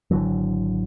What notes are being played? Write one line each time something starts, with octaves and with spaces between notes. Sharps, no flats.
G#1 D3 E3 F#3